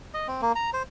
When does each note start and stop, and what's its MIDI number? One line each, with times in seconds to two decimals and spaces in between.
0.14 0.28 75
0.28 0.41 60
0.42 0.52 58
0.55 0.70 82
0.73 0.83 72